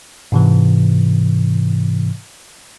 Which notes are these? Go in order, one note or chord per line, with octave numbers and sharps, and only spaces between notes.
G#2 C3 E3